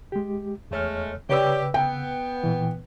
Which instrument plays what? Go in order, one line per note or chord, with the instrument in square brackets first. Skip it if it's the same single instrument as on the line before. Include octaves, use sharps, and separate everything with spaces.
[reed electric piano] G#3 G4
[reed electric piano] E2 C#5 F6 [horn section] G#3 A3
[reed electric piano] C#3 B4 E6 [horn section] G4 [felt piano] C#5 D5
[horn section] B3 [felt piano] G5
[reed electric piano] A#2 E3